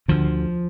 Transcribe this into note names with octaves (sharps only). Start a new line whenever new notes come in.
D2 D3 F3